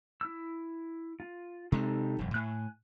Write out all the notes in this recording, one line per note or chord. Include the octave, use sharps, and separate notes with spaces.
E4 E6
F4
C3 G#3 C4 D#4 G4 A4
E1 F#2
A2 G#5 F#6